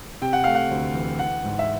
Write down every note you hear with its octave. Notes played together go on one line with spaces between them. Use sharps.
C3 G5
F#5
A3 F5
F#5
D2
E3
E3 F#5
G#2
E5